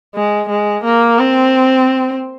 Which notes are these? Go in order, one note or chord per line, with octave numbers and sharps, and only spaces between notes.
G#3
G#3
A#3
C4